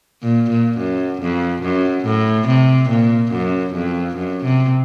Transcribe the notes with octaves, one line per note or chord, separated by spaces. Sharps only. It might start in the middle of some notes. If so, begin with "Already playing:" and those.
A#2
A#2
F#2
F2
F#2
A2
C3
A#2
F#2
F2
F#2
C3